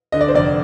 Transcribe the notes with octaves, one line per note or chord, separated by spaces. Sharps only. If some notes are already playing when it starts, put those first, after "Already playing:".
D3 D#5
D5
C5
F1 D5